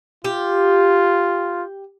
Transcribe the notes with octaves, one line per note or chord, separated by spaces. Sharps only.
F4 G4